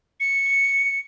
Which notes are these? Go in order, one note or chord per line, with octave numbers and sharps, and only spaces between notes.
C#7